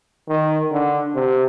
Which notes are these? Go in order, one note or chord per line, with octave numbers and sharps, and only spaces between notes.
D#3
D3
C3